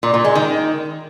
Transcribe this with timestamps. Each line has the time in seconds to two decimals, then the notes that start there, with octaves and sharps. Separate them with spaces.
0.03 A#2
0.14 A#2
0.25 G#3
0.35 D#3